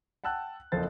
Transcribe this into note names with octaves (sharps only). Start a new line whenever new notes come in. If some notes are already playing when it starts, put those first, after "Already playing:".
F#5 G5 A5 E6 F#6
F#1 F2 A4 C5 F5 A6